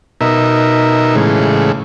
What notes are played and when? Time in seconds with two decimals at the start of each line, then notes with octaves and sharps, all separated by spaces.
0.21 B2 D#4 A#4 E5
1.15 A2 C#3 E3 G#3